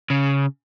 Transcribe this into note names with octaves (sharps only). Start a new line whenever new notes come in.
C#3